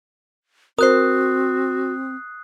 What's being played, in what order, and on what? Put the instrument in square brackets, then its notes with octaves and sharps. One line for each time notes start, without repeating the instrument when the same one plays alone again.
[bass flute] C4 [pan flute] F#4 [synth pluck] A#4 C5 [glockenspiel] D#6 F#6 C7